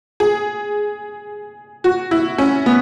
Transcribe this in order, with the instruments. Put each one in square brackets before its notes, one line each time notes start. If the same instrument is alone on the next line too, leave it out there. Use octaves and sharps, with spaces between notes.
[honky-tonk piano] G#4
F#4
E4
C#4
B3